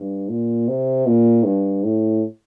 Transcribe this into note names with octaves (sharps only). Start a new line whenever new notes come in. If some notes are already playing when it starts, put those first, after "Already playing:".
Already playing: G2
A#2
C3
A#2
G2
A2